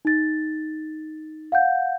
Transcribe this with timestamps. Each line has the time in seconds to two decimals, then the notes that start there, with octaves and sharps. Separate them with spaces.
0.05 D#4 A6
1.52 F5 F#5 G6